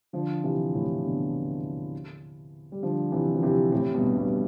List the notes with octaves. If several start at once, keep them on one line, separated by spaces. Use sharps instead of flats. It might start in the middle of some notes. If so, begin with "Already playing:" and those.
D3 F3
C3 E3
A2 C3
B2 D3
G3
D3 F3
C3 E3
F3
C3 E3
A2 C3
G2 B2
G2 B2